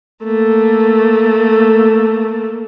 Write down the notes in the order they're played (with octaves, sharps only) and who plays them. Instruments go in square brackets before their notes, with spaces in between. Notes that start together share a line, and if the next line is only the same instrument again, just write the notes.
[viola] A3 A#3